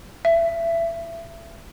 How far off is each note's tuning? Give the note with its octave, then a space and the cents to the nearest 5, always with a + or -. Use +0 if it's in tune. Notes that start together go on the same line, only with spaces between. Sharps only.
E5 +25